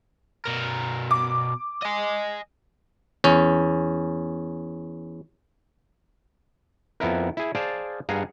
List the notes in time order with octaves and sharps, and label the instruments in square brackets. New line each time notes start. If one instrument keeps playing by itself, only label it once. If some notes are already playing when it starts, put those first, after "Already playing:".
[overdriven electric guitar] B2 A#4
[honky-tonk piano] D6
[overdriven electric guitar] D#5 G#5
[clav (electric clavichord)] E2 C#4
F2 B3 E4 A#4
E4 G#4
G#4 C5 D5 F5 A5
G2 G#4 F5 F#5 A#5